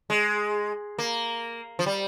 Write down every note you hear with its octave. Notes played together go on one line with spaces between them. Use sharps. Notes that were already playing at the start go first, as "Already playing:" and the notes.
G#3
A#3
F3
G3